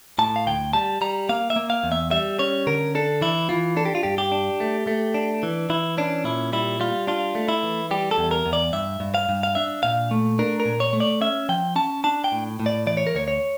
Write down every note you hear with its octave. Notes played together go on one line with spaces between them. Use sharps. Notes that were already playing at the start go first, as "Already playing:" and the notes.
A2 A5
F5
D2 G5
G3 A5
G3 A#5
A#3 F5
E5
A#3
F5
E2
E5
G3 E5
C#4 C#5
D3 A#4
D4 A4
E3 E4
E3 F4
D4 A4
G4
F4
G2 G4
G4
D4
A3
A3
D4
E3
E3 E4
C#4 D4
A#2 E4
G3 E4
G3 F4
D4 F4
A3
E4
E3
G3 G4
A4
E2
A#4
E2
D5
G2 E5
G2
F5
G2
F5
D4 E5
A#2 F5
A3
D4 A#4
A#4
A#2
C#5
A3
D5
C#4 E5
F3 G5
C#4 A5
D4 A5
G5
A2
A2
D5
E3 D5
C#5
A#4
D2 C#5
C#5